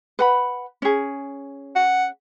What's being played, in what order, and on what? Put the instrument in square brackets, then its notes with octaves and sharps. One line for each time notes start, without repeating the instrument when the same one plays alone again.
[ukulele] B4 F#5 B5
C#4 G#4
[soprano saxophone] F#5